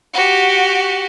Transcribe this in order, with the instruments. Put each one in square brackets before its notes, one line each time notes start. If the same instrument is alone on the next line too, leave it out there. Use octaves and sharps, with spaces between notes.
[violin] F#4 G4